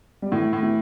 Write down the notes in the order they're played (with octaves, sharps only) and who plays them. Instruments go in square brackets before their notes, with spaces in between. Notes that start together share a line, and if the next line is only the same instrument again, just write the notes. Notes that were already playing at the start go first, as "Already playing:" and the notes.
[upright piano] G3
[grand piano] A2 [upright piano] E3
[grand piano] A2
[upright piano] E3